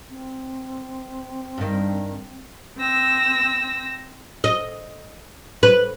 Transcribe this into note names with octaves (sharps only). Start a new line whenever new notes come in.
C4
G2 D#3
C4 E6 A#6
D#5
B4